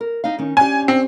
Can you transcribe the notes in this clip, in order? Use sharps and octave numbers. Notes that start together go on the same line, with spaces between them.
A#4
D#4 F5
D#3 C#4 D#4
C#4 D4 G4 G#5
C4